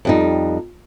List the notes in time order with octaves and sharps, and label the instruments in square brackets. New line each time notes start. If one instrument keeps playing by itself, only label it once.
[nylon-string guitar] F2 G3 D#4